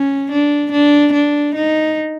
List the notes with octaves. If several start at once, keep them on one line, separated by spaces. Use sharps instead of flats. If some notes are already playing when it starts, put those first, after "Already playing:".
Already playing: C#4
D4
D4
D4
D#4